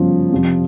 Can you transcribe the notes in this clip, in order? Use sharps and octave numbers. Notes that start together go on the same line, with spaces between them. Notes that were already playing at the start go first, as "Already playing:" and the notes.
Already playing: G1 F#2 C#3 F3
F2 C3 F3